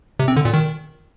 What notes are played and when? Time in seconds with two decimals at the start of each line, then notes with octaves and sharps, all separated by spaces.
0.19 C3
0.28 C4
0.37 D3
0.45 A#2
0.54 D#3